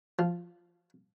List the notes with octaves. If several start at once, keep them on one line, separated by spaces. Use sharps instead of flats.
F3